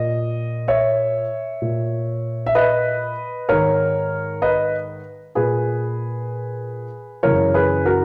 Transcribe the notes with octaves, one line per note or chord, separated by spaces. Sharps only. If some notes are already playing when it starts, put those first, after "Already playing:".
Already playing: A#2 D#5
C#5 E5
A#2
E5
B4 D#5
G#2 D#3 A#4 C#5
B4 D#5
A#2 G#4 B4
F#2 C#3 E3 A#4 C#5
G#4 B4
F#4 A#4